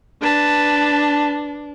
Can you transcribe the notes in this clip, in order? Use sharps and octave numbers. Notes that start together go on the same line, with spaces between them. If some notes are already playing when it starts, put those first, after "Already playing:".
D4 B4 A5